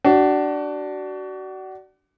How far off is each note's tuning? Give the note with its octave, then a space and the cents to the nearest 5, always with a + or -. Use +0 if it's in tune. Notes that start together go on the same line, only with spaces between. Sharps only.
D4 +0 F#4 +30